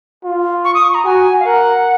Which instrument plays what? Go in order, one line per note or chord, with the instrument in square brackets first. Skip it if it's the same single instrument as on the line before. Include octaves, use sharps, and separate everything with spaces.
[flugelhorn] F4
[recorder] C#6
D#6
C#6
A#5
[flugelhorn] F#4 [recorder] G#5
[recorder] F5
[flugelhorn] A#4 [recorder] F#5